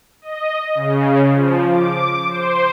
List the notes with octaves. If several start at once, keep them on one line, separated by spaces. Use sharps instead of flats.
D#5
C#3
F3
D6
C5